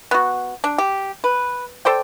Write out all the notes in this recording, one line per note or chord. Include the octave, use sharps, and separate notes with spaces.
B3 F#4
D4
G4
B4
A4 C5 D5 G5